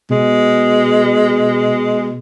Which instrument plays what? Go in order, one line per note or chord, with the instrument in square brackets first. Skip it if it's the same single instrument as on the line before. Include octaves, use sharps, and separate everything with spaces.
[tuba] B2 [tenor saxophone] G#3